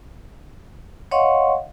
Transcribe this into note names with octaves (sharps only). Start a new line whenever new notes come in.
C#5 D#5 F5 F#5 C6 C#6